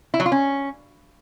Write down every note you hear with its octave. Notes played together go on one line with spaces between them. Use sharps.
E4
F#3
F4
C#4